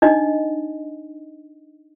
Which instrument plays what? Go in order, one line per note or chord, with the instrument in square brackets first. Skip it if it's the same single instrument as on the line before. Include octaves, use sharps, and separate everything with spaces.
[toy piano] D4 D#4 D#5